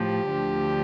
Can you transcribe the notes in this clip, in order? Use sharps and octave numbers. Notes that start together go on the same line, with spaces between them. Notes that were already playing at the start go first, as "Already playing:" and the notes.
Already playing: A2 F3 G4
D2 D3 F3